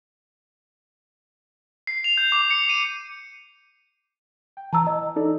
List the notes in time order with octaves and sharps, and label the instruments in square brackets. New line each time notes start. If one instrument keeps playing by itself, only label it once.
[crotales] C7
F7
G6
D6
C#7
D#7
[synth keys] G5
[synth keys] E3 [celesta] A5 A#5 E6
[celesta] D#5
[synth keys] D#4 A4 D5